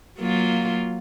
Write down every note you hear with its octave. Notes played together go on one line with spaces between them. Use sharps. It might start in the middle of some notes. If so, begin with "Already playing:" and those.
F#3 A#3 F4